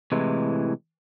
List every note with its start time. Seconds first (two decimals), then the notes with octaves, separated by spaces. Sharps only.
0.12 A2 C3 E3 G#3